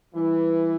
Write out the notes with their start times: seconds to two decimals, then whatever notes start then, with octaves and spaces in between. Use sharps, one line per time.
0.14 E3 G3 E4 B4